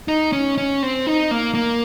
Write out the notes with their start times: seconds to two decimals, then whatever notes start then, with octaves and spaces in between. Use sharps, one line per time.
0.08 D#4
0.33 C#4
0.58 C#4
0.83 C4
1.07 D#4
1.31 A#3
1.55 A#3